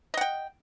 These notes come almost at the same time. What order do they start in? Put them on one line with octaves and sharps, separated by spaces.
D#5 F#5 G5